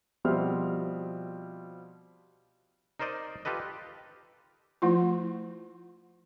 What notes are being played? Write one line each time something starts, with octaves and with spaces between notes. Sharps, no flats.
B2 F3 G3 C4 E5 F6
D#4 A#4 C5 D5 D#5
F4 G4 A4 B4 D#5
F3 A3 E4 F4